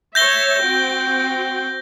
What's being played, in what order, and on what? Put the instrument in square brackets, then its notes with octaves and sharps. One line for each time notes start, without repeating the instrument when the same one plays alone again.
[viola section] C#5 E5 [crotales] G6 A#6 G7
[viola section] C4 F#4 G5